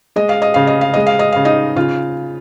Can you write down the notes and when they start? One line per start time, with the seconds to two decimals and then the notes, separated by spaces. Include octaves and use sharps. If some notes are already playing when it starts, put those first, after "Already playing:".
0.16 G#3 D#5
0.29 F5
0.42 D#5
0.54 C#3 F5
0.67 D#5
0.81 F5
0.94 G#3 D#5
1.07 F5
1.19 D#5
1.32 C#3 F5
1.45 D#4 D#5
1.76 C#3 F4 F5